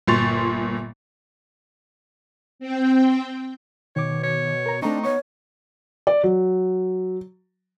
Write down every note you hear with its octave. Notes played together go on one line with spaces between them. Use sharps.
G1 A#2 C6 C#6 A6 F7
C4 G5
B2 D#3 C#5 D6
C#5
A#4 A#5
A3 C4 D4 D#4 A#5 C#6
B3 C#5 C#6
D5
F#3